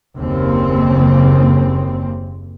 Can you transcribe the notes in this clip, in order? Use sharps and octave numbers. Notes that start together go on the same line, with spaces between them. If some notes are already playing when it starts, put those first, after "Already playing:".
F#1 D#2 C#3 C4